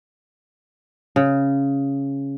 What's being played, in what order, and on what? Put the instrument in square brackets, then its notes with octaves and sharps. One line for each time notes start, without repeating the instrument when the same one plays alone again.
[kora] C#3